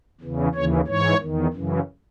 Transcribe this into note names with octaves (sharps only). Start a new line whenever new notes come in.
E2 C#3 E3
D#2 C#3 E3 C#5
G#2 E3 C#5
E2 D#3
F#2 C#3 E3